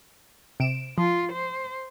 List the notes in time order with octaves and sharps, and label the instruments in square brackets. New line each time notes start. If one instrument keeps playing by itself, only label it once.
[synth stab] C3 D7 E7
[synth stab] F3 [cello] F4
[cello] C5